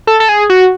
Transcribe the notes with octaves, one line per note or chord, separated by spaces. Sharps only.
A4
A4
G#4
F#4